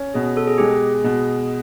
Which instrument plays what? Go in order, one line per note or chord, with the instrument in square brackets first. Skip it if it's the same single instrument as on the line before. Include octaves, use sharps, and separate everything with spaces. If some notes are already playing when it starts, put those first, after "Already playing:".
Already playing: [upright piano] C#4
[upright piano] B2 [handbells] G#4
[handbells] A4
G#4
[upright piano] G#3 [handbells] G4
[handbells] G#4
[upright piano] B2